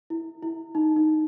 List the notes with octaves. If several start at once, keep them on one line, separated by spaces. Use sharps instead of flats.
E4
E4
D#4
D#4